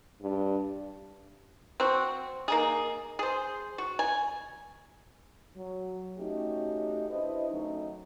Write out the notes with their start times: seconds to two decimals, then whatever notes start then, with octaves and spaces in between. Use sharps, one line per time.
0.21 G2
1.80 C4 F#4
2.48 A#3 D#4 G#4
3.19 G#4 C5
3.78 F#4
3.99 G#5
5.56 F#3
6.18 A3 C#4 D#4 F#4 G4
7.09 D4 E4 B4 C5 D#5
7.50 D#3 F#3 A3 C#4 D#4